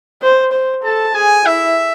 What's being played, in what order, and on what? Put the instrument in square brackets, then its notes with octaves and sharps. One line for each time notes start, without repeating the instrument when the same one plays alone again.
[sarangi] C5
C5
[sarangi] A4 [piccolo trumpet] A5
[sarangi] G#4 [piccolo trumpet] G#5
[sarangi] E4 [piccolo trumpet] E5